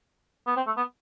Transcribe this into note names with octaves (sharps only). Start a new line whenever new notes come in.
B3
C4
A3
B3